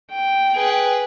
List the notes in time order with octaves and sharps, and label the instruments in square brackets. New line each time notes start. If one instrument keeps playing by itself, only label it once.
[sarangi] G5
[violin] G#4 B4